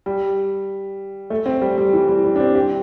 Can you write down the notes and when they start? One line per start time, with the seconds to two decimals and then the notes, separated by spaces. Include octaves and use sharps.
0.06 G3
1.30 A3
1.46 C4
1.62 G3
1.78 G3
1.93 E3
2.09 G3
2.24 G3
2.36 D4
2.40 C4
2.55 G4